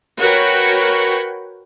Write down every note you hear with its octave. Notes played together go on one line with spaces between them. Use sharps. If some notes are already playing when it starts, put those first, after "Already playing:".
F#4 A#4 B4 C#5 F#5 G5